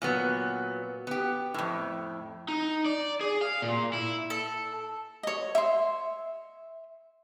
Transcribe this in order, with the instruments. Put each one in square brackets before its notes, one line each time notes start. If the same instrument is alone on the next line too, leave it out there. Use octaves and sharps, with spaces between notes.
[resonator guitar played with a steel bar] A#2 F#3 B3
B3 G4
F2 A2
[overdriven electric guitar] D#4
D5
G#4
F5
A#2
E4
[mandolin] A4
[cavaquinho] C#5 D#5
E5 C6